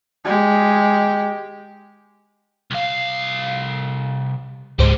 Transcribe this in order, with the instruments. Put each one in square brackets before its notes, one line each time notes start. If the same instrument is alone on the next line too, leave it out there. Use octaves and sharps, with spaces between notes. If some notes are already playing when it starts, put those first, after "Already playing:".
[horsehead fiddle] G#3 G4
[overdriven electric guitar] C2 F5
[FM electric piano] C#2 G#2 C5 [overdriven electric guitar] G3 G#3